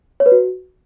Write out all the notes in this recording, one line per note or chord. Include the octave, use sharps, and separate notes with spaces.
C#5
B4
F#4